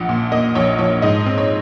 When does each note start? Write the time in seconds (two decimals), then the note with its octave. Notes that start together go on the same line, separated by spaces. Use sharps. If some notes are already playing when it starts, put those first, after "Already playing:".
Already playing: A#1 F3 F#5
0.09 A#2
0.32 A#3 D#5
0.55 A#1 C#5
0.79 F3 C#5
1.02 G#2 D#5
1.26 C4
1.38 C#5